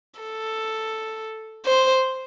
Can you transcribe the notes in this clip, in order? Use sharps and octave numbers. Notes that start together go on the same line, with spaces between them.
A4
C5